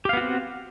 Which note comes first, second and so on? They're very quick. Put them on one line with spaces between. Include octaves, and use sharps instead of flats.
G4 F5 B3 F#4 C4